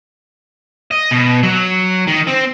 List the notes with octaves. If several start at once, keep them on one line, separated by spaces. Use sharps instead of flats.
D#5
B2
F#3
D#3
C4